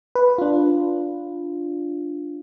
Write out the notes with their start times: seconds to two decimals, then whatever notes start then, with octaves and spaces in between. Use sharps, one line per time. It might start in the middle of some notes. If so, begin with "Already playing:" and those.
0.15 B4
0.38 D4 F4